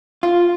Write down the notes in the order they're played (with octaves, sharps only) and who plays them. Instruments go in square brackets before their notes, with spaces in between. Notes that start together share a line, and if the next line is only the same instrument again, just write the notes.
[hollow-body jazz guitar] F4